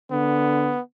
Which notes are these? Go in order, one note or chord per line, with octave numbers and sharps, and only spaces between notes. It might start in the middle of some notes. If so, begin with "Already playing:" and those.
D3 B3